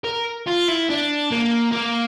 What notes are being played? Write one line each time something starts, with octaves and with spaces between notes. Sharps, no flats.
A#4
F4
E4
D4
A#3
A#3